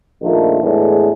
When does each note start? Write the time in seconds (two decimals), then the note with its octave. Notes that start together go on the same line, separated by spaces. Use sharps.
0.21 A#1 A#2 D#3 F3 A3
0.62 E2 A2 D3 G#3 A3